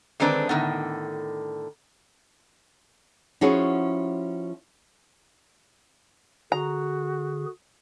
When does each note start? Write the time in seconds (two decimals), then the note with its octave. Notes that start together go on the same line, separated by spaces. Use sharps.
0.20 D3 D#3 G#3 C4 D4 B4
0.49 A2 D3 D#3 B3
3.41 F3 C#4 E4 F#4 G#4
6.52 D3 F#4 G#4 A#5